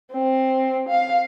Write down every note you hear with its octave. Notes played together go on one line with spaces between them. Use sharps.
C4
F5